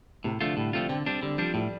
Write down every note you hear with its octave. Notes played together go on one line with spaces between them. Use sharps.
A2 C3
D3 F3 A3 F4
A2 G3
F3 A3 C4 F4
D3 C4
G3 C4 D4
D3 G3
F3 G3 D4
A2 G3